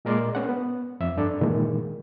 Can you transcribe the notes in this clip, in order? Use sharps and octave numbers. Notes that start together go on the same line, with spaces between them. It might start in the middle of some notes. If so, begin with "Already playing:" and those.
A#2 G#3 A#4 D5 C6
B3 C#4 F#5
B3
F2 E5
G2 D4 A4
A#2 D#3 E3 G#3